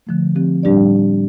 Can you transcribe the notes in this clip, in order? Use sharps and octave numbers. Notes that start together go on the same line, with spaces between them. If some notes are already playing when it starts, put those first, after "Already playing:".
D3 F3 A3
D3 F3 C4 G4
A2 G3 D4 G4 D5